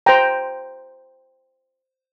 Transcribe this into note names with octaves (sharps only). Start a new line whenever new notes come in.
C5 G5 A#5